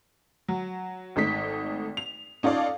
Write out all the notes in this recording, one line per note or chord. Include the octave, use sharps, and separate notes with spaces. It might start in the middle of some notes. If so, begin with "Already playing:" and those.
F#3
G#1 A3 D#4 B6
F7
C#4 D#4 F4 A4 D5 F5